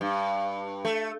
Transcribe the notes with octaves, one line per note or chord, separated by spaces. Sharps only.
G2
A3